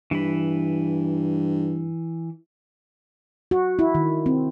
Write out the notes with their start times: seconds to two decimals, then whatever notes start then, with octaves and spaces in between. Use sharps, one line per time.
0.11 G2 E3 B5
3.51 F#4
3.79 E4
3.95 D#3
4.26 C4